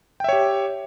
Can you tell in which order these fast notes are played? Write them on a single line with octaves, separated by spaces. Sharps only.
G5 E5 C#5 G4